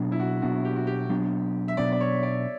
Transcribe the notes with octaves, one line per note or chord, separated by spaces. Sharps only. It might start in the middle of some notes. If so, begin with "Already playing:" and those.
Already playing: B2 F#3 B3 D4
E4
F#4
B2 F#3 B3 D4 F#4
G4
F#4
G4
B2 F#3 B3 D4
E5
B2 F#3 B3 D4 D5
D5
C#5
D5